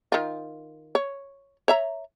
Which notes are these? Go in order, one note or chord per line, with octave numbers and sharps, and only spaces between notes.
D#3 F4
C#5
C#5 E5 A#5